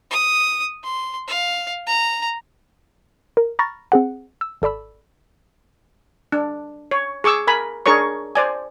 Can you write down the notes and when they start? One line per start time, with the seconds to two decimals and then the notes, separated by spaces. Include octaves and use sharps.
0.11 D#6
0.84 C6
1.28 F5
1.87 A#5
3.37 A#4
3.59 A#5 B5 C#6 F6 A6 A#6
3.92 C4 G#4 F#5
4.41 E6
4.62 G#1 A4 D5 B5 E6
6.32 D4
6.91 C#5
7.24 G#4 C#6 D6 E6
7.47 A#4 G#5 B5
7.86 D4 G#4 A#4 C#5 C#6
8.35 C5 D5 G#5